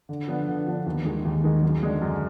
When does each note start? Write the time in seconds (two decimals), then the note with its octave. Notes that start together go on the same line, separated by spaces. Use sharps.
0.09 D3
0.28 F3 B3 D4
0.47 D3
0.67 F3 B3 D4
0.86 D#2
1.05 D#3 G#3
1.25 D#2
1.44 D#3 G#3
1.63 F#2
1.82 D3 G#3 D4
2.02 F#2